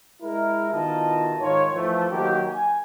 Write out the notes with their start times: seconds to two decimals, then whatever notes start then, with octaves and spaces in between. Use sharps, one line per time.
0.21 G#3 E4 A#4
0.71 B2 D#3 E4 F4 D#5 A5
1.39 G#2 D#3 F4 C#5
1.74 E3 F3 A3
2.10 D#3 F#3 A#3 D#4 G4
2.47 G#5